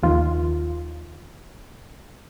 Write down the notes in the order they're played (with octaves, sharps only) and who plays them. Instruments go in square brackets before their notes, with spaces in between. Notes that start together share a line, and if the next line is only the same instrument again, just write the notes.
[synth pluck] D#2 D#3 F4